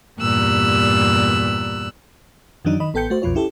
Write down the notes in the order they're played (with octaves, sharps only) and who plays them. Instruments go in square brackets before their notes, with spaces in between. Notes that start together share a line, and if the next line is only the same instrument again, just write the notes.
[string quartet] E2 G2 A#2 G3 E6 F#6
[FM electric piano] F#2 D#3 E3 F#3 D4 D#4
D#3 D#5 B5
A1 B3 A4 G5 G6 C#7
A3 F#4 C5
B1 F2 B2 F4 C#5
C#4 E4 G4 A4